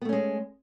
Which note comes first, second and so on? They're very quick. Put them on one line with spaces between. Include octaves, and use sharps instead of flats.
B3 A3 C#4 G#3